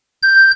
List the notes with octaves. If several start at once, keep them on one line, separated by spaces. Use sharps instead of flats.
G6